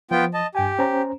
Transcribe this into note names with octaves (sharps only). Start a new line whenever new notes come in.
F3 B3 F4 G5
D#5 A5
G2 G4 G5 G#5
C#4 C5 A#5